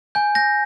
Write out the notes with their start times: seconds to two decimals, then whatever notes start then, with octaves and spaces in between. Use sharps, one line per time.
0.15 G#5 G6
0.35 G6 A#6